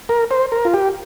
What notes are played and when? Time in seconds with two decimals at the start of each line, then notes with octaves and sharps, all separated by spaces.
0.09 A#4
0.31 C5
0.52 A#4
0.65 F4
0.74 G4